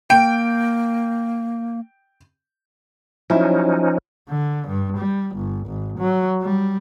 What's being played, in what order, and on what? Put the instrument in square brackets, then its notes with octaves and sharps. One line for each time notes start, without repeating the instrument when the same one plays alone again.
[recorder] A#3 [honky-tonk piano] G5 D7
[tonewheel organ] F3 C#4 D#4 [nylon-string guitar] F#3 E4
[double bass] D3
G2
G3
G1
G#1
F#3
G3